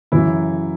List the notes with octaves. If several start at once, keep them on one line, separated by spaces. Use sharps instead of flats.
F#2 C#3 E3 F#3 E4